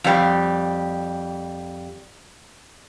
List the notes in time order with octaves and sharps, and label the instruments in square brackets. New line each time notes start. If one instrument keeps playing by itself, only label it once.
[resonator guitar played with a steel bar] F2 G3